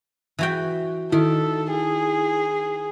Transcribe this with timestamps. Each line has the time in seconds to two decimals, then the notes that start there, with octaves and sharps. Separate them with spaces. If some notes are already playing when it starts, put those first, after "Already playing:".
0.39 E3 F#4 G5
1.12 D#3 E4 A4
1.71 G#4